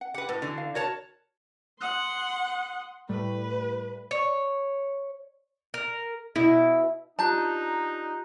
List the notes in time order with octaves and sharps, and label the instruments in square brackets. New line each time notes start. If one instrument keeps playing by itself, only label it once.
[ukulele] F#5
[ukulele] G4 [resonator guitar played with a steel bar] B4 F#5
[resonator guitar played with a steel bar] A2 [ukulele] F#4 B4
[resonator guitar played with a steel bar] D3 E3
[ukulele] F5
[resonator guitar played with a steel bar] F#4 C#5 A5 [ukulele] A#4
[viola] F#5 C6 [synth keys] D#6 F#6
[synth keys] A2 G3 A3 [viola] B4
[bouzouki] C#5
A#4
[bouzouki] B2 [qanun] E4
[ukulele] D4 A5 [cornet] D#4 [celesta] F4 G4 F#6 [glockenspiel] A#5 G6